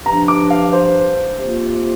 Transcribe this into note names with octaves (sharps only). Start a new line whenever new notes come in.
G2 F3 D4 A#5
D6
F5
C5
C3 A#3 F4